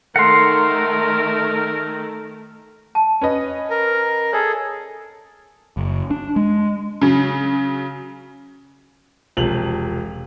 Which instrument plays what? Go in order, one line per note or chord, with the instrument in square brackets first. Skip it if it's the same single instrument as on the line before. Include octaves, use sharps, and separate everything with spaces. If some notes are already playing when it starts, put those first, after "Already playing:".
[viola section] D#3 A3 [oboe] A#4 [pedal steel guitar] F#5 C6
[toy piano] A5
[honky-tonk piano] C#4 B4 D#5
[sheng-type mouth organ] A#4
[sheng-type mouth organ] G#4 A4 [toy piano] C#5
[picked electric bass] F#1
D4
G#3
[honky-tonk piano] C#3 F#3
[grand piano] E1 C3 F3 F7 F#7